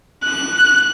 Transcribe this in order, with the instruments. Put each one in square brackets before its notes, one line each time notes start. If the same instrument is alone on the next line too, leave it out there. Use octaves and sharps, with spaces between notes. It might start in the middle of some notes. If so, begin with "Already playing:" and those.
[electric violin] F#6